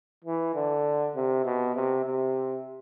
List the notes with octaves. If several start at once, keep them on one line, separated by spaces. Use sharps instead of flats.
E3
D3
C3
B2
C3
C3